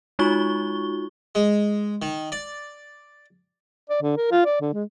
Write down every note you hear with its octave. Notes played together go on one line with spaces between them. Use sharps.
G#3 D#4 F4 F#4 C#6 G7
G#3
D#3
D5
D5
D3
A#4
F4
D5
D3
G#3